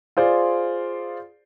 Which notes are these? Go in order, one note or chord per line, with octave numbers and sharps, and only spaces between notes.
F4 G#4 C5 D5